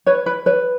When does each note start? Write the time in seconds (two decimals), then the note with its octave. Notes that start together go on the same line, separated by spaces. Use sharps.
0.06 B4 C#5
0.26 B4
0.46 B4 C#5